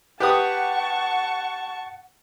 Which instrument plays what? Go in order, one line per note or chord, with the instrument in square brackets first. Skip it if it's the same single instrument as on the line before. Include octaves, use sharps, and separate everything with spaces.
[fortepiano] G4 B4 D#6 [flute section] F#5 [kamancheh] A5 C#6